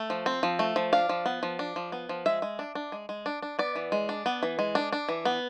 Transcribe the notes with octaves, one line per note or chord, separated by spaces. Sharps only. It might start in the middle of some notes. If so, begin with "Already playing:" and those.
Already playing: A3
F3
C4
F3
A3
F3
D4 F5
F3
B3
F3
D4
F3
B3
F3
G#3 E5
G#3
D4
D4
G#3
G#3
D4
D4
B3 D5
E3
G#3
D4
B3
E3
G#3
D4
D4
E3
B3